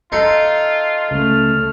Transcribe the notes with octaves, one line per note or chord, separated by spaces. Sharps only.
D#4 F4 A4 C6
C#2 A3 F6